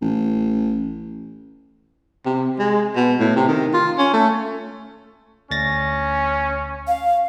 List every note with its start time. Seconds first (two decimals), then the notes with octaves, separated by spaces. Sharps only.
0.01 A1
2.26 C3
2.59 G#3
2.96 B2
3.20 A2
3.37 C3
3.48 D#3
3.74 F4
3.98 C#4
4.13 A3
5.51 D2 C#4 A6 A#6
6.88 F5